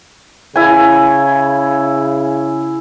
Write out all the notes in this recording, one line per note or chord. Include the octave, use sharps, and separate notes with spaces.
C#3 E4 G#5